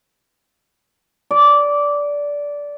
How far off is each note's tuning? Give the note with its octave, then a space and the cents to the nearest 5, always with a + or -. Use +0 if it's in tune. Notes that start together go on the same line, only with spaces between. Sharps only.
D5 -15